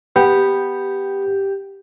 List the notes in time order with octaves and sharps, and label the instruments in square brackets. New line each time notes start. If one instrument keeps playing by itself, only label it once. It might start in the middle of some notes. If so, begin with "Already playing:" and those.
[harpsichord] B3 [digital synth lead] G4